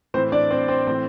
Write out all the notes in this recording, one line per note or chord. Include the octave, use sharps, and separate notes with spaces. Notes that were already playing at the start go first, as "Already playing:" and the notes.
A2 E3 C4 C5
D4 D5
C4 C5
C4 C5
A2 E3 C4 C5